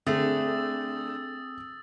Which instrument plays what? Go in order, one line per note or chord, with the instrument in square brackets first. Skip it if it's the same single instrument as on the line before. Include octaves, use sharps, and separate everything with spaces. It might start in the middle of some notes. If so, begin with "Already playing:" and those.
[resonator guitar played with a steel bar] D3 A3 [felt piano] C4 G#4 [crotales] D#6 E6 A6